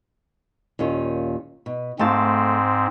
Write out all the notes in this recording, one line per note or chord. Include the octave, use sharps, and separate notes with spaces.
D#2 A#2 C#4
B2
G#2 A3 C4 F5 A5